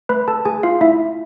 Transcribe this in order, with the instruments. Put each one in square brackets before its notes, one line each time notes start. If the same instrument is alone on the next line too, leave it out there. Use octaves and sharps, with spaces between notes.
[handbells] A3 B4 B5
A4 A5
A3 G#4 G#5
F4 F5
A3 E4 E5